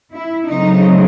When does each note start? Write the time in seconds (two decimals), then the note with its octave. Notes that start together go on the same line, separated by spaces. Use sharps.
0.12 E4
0.49 C#3 F#3 A3 C4 D#4